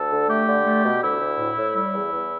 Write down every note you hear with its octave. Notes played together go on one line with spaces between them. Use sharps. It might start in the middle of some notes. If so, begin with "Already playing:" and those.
Already playing: D2 A4
D3
A3 G4
D3
A3
B2
D2 E4
D2
A2
A2
G3 E4
E2
E2